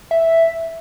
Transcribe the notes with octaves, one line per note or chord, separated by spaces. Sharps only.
E5